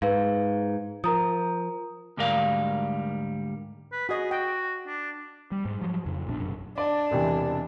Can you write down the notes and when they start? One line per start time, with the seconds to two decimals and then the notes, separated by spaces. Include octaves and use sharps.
0.02 G#2 B4 F5
1.04 F3 A#4 A#5 D#6
2.17 D2 G#2 G3 A#4 F5
3.92 B4
4.09 F#4 G#4 D#5
4.31 F#4 G5
4.86 D4
5.52 G3
5.65 G#2
5.81 F3 F#3
6.06 F2 C#3
6.27 A#1 B2 C#4 D4
6.40 F#1 B1 F#2
6.78 D4 D5
7.11 E1 C3 E3